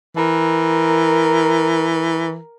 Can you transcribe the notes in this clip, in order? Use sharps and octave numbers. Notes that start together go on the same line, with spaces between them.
E3 A#4